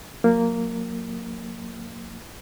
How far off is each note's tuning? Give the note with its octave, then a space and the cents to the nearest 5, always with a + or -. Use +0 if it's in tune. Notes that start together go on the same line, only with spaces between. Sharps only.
F#3 -40 A#3 -10